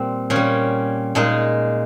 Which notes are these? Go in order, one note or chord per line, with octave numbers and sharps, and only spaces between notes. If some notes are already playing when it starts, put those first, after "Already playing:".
Already playing: A#2 G3 C4
A#2 C#4
G3
A#2 G#3 D#4